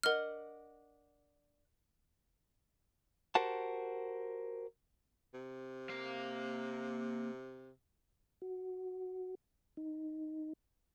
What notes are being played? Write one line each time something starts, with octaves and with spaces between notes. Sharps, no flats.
D4 A#4 D#5 F#5 F6
F#4 G4 A#4 C5 F#5 A5
C3
A#3 F5
F#4
D#4